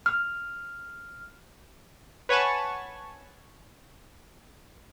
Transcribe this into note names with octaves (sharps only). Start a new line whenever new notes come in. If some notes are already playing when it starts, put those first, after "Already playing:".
F6
B4 C#5 F#5 G#5 A5 C#6